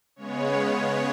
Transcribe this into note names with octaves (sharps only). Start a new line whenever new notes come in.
C#3 G#3 B3 C#5